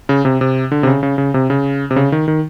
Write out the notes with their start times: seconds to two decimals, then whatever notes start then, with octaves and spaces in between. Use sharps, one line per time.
0.09 C#3
0.25 C3
0.41 C3
0.72 D3
0.83 C3
0.87 C#3
1.03 C#3
1.18 C#3
1.34 C3
1.50 C#3
1.91 C3
1.96 C#3
2.12 D#3
2.28 D#3